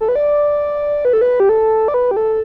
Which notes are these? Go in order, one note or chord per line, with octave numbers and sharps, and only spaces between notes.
A4
B4
D5
B4
A4
B4
G4
A4
D5
B4
G4
A4